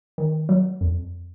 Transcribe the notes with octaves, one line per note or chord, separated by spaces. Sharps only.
D#3
F#3
F2